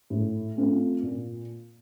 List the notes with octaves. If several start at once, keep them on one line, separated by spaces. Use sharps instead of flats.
A2
A3 C4 F4
A#2